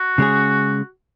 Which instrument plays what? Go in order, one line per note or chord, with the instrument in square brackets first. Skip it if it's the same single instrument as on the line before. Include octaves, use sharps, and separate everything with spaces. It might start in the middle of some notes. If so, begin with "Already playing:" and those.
Already playing: [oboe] F#4
[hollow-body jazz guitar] C#3 G#3 C#4 G#4